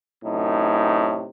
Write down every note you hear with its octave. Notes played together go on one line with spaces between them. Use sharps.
F#2 A2 C3 D#4